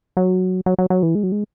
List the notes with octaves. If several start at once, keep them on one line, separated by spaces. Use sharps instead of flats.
F#3
F#3
F#3
F#3
E3
G#3
F#3
G#3